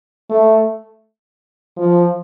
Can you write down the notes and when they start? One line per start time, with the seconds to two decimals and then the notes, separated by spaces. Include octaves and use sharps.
0.30 A3
1.77 F3